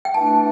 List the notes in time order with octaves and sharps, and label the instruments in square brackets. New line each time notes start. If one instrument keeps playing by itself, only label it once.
[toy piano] G5
[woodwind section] E3 A3 D4 [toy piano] A5